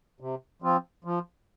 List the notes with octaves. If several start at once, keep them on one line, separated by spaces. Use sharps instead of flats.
C3
F3 C4 F4
F3